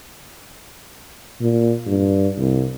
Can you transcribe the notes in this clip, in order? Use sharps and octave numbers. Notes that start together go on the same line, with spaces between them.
A#2
G2
C2